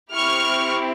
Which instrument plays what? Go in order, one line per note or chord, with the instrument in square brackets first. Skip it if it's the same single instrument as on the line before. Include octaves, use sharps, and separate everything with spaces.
[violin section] C4 E4 G4 C#6 F6